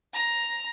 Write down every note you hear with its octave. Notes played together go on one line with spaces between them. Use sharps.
A#5